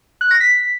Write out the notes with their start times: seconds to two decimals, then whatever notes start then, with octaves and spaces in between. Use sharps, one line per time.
0.21 F#6
0.31 A#6
0.40 B6